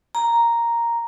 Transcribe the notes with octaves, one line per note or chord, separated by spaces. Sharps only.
A#5